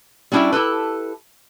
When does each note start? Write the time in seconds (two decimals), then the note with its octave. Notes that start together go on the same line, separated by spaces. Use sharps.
0.32 G3 C#4 D4 E4 F#4 E5
0.52 E4 G4 A4 B4